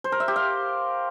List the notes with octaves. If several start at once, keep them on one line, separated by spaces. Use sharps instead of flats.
C5
A#4
E5
G4
F5